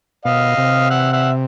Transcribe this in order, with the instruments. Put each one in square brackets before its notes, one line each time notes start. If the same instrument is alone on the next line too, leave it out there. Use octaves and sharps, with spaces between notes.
[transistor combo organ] B2 [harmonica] D#5 F5
[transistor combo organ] C3
[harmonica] E5 F#5
E5 F#5